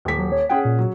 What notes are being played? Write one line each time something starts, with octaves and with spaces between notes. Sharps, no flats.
D#1 B6
F#3
C#5
C#4 G#4 F#5 G5
A#2
F#3